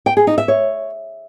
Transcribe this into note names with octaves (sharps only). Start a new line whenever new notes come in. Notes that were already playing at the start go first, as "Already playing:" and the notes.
G5
G#4
D#4
E5
C#5